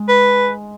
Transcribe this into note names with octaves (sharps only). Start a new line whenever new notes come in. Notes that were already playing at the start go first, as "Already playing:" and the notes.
Already playing: G#3
B4